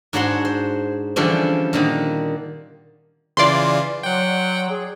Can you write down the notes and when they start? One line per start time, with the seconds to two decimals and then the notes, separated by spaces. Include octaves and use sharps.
0.13 G#2 D4 F#4 C#5 F#5 C6
0.45 C5
1.16 D3 E3 F3 G3 C#4 D4
1.73 A#2 D3 D#3
3.37 C#3 E3 F4 D5 C6
4.03 F#3 F#5 G5
4.70 G#4